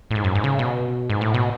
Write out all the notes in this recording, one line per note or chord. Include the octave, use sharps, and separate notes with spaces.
A2
G#2
F#2
G#2
C#3
B2
G#2
A2
B2